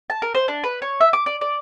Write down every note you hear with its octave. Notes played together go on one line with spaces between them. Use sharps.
A5
A#4
C5
D4
B4
C#5
E5
D6
D5
D5